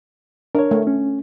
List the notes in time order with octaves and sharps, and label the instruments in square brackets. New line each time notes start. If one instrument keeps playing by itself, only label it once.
[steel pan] D4 [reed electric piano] A#4 C#5
[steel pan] A3
[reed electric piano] C#4